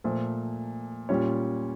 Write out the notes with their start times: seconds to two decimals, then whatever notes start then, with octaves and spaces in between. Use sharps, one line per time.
0.04 A#2 F3 A3
1.09 A#2 G3 C#4 F4 C#5